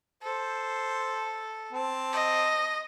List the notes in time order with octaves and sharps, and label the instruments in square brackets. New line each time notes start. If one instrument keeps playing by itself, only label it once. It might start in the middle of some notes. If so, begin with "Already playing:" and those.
[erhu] A4 [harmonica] C5
[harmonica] C4 A5
[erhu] D#5